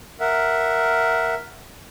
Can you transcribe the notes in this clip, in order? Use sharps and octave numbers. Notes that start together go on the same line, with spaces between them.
A#4 E5 F#5